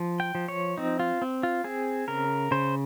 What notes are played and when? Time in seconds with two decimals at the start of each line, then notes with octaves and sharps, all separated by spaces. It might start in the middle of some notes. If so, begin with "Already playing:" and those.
Already playing: F3
0.20 G5
0.35 F3
0.49 C#5
0.78 C4 D#4
1.00 F4
1.22 C4
1.43 F4
1.64 C4 G#4
2.08 C#3 A#4
2.51 C#3 C5